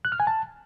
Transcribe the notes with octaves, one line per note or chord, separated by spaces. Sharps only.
F#6
F6
G#5
A5